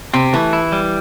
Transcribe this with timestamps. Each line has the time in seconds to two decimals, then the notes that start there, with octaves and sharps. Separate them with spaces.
0.14 C3 C4
0.33 E3 A3
0.53 E4
0.72 G3